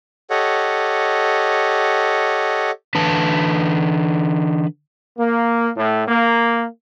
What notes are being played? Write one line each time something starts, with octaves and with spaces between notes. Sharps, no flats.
G4 A4 C#5 D#5 F#5
D3 E3 B4 A5
A#3
A2
A#3